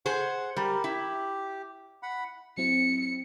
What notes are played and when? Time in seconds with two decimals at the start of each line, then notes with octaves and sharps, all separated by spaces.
0.06 G#4 C5 F#5
0.57 G3 G4 A#4
0.84 E4 G4
2.03 F#5 B5
2.58 F#3 C4 E4 C#7